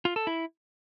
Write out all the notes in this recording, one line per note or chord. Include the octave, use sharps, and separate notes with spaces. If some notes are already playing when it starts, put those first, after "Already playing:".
F4
A4
E4